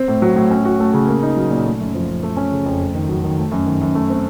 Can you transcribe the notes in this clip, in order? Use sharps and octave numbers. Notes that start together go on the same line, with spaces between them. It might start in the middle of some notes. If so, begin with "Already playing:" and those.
Already playing: C4
A2
F#3
A2
C#4
F#4
A3
C#3
A#3
D#4
F#3
A#2
A3
F#2
F3
F#2
A3
C#4
C#3
F2
A3
D#3
F#3
D#3
A3
F#2
D#3
F#2
A3
C4